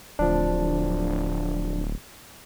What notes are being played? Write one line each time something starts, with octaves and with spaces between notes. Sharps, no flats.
D1 F3 D4